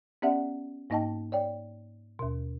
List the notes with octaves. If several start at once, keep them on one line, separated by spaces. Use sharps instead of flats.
B3 C#4 G4 D5 E5 F#5
G#2 A#3 D#4 D#5 G5 A5
C#5 D5 G5
D#2 B2